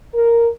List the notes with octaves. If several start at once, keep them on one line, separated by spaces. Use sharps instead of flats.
A#4